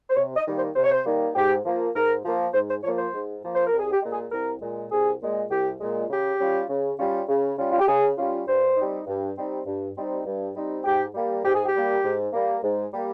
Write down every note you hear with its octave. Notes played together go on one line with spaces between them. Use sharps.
C5
C3 C#5
D#5
D#3 G3 A#3
C5
C3 C5
C#5
C5
D#3 G3 A#3
G#2 G4
F3 A#3
G#2 A#4
F3 A#3
G#2 C5
C5
F3 A#3 C#5
C5
G#2
F3 A#3
C5
A#4
C2
G#4
G4
A#2 G#3
G#4
C2 A#4
A#2 G#3
C2 G#4
A#2 G#3
C2 G4
A#2 G#3
C#3 G4
G3 C#4 F4
C#3
G3 C#4 F4
C#3
G3 C#4 F4
F4
G4
C#3 G#4
G3 C#4 F4
G2 C5
G3 C4 D#4
G2
G3 C4 D#4
G2
G3 C4 D#4
G2
G3 C4 D#4
G#2 G4
G3 A#3
G#2 G4
G#4
G4
G3 A#3
G#2
G3 A#3
G#2
G3 A#3